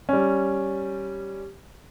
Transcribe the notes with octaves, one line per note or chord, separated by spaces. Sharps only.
G3 C#4